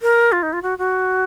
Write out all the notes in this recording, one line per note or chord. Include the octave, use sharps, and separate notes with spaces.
A#4
F4
D#4
F4
F#4
F#4